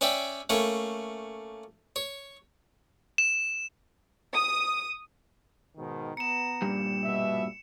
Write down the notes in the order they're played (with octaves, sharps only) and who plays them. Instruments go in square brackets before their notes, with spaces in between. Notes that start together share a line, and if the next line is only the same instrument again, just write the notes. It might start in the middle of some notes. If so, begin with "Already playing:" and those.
[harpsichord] C#4 C#5 D5 E5 G5
A3 A#3 C#4 C#5
C#5
[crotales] E7
[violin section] D#6
[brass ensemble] G#2 B2 D#3
[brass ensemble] B3 A#5 [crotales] C#7 E7
[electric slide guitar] G2 A#2 G3
[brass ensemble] B2 E5